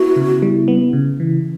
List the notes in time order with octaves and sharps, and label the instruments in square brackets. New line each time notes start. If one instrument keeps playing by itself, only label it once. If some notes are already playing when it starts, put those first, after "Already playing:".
Already playing: [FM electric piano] B3 E4 [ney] F#4
[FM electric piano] C#3
G3
B3
C#3
E3